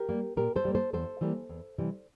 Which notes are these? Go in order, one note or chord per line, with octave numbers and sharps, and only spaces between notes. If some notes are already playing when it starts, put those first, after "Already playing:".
Already playing: G4 A#4
G3 A#3
A#2 G4 A#4
A4 C5
G3 A#3
A4 C5
E2 A4 C5
E3 G3 A#3
E2
C3 E3 G3